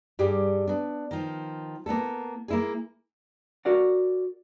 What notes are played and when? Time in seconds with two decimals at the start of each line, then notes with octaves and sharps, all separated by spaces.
0.19 G2 G3 G4 G#4
0.67 B3 D4
1.11 D#3 F3
1.86 A#3 B3 E4 A4
2.48 A#3 E4 G#4
3.65 F#4 A#4 D5 F#5